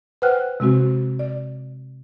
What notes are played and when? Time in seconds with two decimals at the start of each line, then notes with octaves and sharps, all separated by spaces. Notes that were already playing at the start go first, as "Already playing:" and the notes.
0.22 B4 C5 F#5 G5 F6 F#6
0.60 C3 G#3 C4 F#4
1.19 D5